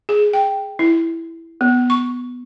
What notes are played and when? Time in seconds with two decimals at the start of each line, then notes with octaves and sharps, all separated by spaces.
0.09 G#4
0.33 G5
0.79 E4
1.61 B3
1.90 C#6